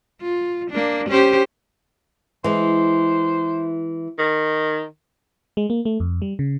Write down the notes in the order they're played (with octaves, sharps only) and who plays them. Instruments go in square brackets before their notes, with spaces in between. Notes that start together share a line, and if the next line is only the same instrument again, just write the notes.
[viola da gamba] F4
A#3 D4
C#4 G4 C5
[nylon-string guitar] E3 G#3 [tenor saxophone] C5
[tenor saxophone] D#3
[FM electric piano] G#3
A#3
A3
F2
G3
C#3